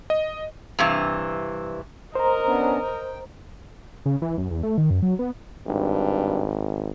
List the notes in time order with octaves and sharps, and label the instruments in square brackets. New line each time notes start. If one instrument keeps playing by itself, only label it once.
[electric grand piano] D#5
[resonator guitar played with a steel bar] G2 C3 E3
[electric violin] A#4 D#5 [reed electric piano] C5 A#5
[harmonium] B3 C#4 D4
G5
[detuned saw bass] C#3
E3
F#2
E2
A3
D#3
F#2
F#3
B3
[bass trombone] G#1 [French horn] G2